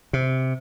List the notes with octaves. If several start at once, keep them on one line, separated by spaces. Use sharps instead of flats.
C3